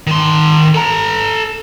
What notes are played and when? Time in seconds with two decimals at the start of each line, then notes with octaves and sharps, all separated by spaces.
0.07 D#3 C6
0.75 A4 A#5